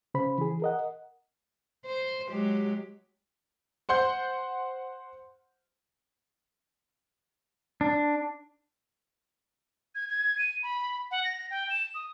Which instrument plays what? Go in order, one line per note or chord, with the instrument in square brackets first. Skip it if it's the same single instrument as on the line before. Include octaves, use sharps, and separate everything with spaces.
[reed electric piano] C#3 C5 B5
E3 G#4
A#4 D#5 F#5
[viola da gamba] C5
F#3 G#3 G4
[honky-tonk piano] C5 F#5 C6 G6
[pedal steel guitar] D4
[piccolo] G#6
G#6
D#7
B5
F#5
A#6
G5
E7
D#6